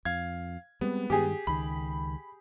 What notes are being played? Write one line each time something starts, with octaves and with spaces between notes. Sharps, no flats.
F2 F5 G#6
G3 G#3 B3 C4
G2 D#3 G#3 G4 G#4
C#2 D#3 B5